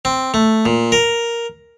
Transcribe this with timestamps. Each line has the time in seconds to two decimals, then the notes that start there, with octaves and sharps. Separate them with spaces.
0.05 C4
0.34 A3
0.65 A#2
0.92 A#4